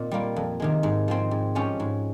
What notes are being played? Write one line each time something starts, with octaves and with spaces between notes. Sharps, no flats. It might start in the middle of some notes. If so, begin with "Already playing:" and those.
Already playing: A#2 C4 D#4
G3 A#3 F4
F2
C3 D#3 G#3
G#2
F3 G#3 C4
G#2
F3 G#3 C#4 G4
G#2